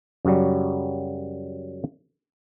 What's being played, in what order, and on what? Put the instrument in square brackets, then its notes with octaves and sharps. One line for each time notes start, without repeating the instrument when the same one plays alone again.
[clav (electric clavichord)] F#2 C#3 F#3 G3